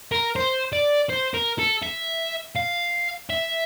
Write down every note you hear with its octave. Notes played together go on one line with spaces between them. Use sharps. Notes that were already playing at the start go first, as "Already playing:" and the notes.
A#4
C5
D5
C5
A#4
A4
E5
F5
E5